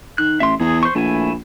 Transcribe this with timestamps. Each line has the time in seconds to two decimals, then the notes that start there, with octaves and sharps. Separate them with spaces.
0.18 D#3 F#6
0.40 A1 E5 C6
0.60 E2 G#4
0.83 C5 C#6
0.95 A#1 A3 E4 G#5